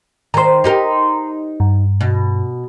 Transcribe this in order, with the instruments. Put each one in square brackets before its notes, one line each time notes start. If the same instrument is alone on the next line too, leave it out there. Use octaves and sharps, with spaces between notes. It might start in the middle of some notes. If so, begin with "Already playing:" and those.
[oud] D#3 C5 [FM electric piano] A#5 C6
[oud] D#4 G4 A#4
[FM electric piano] G2
[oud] B2